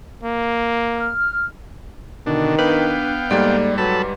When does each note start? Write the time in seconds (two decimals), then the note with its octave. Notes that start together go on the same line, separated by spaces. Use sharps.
0.24 A#3
0.97 F6
2.27 B2 D3 D#3 D4
2.59 B3 D4 B4 F5 G5
3.31 G#2 G3 A#3 A4 D5
3.78 F#3 A4 B4 A5 B5